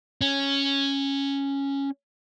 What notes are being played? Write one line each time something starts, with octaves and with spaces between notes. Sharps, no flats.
C#4